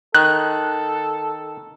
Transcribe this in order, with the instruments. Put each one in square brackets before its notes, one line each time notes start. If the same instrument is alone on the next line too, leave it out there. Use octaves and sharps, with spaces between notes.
[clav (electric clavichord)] D#3 [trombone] A4 [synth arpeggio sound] F#6